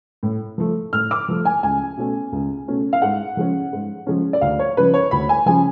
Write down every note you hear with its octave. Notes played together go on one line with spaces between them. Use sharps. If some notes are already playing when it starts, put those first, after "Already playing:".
A2
F3 A3
A2 F6
D6
F3 A3
G#5
C#2 G#5
B2 A3 C#4
C#2
B2 A3 C#4
F5
G#2 F#5
F3 G#3 C#4
G#2
F3 G#3 C#4
D5
D2 F5
C#5
C#3 F3 B4
C#5
D2 B5
G#5
C#3 F3 G#5